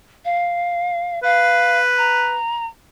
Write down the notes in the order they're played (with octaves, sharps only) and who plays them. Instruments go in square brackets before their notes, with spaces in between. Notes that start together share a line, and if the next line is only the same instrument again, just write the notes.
[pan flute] F5
[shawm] B4 [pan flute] F5
[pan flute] A#5